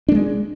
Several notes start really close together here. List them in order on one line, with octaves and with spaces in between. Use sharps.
D4 A3 G#3